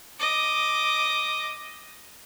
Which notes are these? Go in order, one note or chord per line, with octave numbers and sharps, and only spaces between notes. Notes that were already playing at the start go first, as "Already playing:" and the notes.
D#5 D6